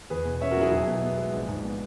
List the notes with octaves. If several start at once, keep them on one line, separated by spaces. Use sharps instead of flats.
E2 G#4 B4
B2
C#4 C#5 E5
F#4 A#4
F#3 E4 G#4
B1 E4 G#4
B2
B3
G#3
A#1
G#2
B3